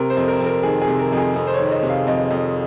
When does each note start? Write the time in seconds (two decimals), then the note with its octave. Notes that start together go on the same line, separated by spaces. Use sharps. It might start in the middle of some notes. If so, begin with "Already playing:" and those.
Already playing: C3 A#4
0.10 C5
0.17 F2
0.28 A#4
0.40 F2
0.46 A#4
0.63 D#3 G#4
0.82 G#4
0.88 C3
0.99 A#4
1.12 F2
1.17 G#4
1.36 F2
1.47 C5
1.53 C#5
1.60 D#3
1.72 D#5
1.83 C3
1.90 F5
2.07 F2 D#5
2.30 F2